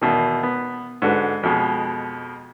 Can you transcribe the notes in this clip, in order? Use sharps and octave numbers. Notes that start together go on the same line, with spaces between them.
E2 B2 D#3
B3
G#2 D3 F#4 B4
F2 B2 G#3